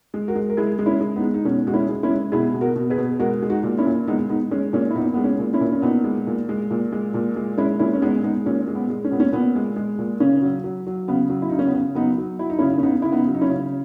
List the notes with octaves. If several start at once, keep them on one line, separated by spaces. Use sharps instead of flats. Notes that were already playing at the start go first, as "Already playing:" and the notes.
G#3
F#4 A#4
G#3
A#4
G#3 E4 G#4
G#3
C#4 E4
G#3
B3 D#4
G#3
D#4
B2 C#4
G#3 F#4
C#4 E4
G#3
C#4 E4
G#3
B2 E4 G#4
B2
F#4 A#4
B2
G#4 B4
B2
G#3 F#4 A#4
G#3
D#4 F#4
A#2
C#4 E4
A#2
G#3 B3 D#4
G#3 B3 D#4
G#3 C#4
A#2 C#4
E4
A#2 B3 D#4
G#3 B3
C#4
A#2
C#4 E4
A#2
C#4
A#2 B3 D#4
G#3
A#2
G#3
A#2
G#3
A#2
G#3
G#3 C#4 E4
A#2 C#4 E4
C#4
G#3 B3 D#4
G#3 B3 D#4
A#2 C#4
G#3
B3
G#3
C#4
A#2 B3
C#4
A#2 B3
G#3
G#3
A#2
C#3 C#4
F#3
F#3
F#3
C#3 B3
F#3
E4
C#3 D#4
C#4
B3
C#3
F#3 B3 D#4
F#3
F#3 E4
D#4
C#4 E4
C#3
C#4
C#3 B3 D#4
C#3 E4
B3 D#4
F#3
D#4
C#4 E4
C#3